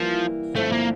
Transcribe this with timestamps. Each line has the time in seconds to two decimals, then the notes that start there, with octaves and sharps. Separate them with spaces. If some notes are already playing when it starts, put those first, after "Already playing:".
Already playing: E3 F3 G3 A#3
0.55 G2 D3 F3 A3 C4 E4
0.72 A#3